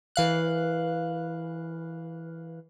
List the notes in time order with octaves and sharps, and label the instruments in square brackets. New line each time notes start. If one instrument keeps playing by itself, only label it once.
[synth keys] E3 F5 F#6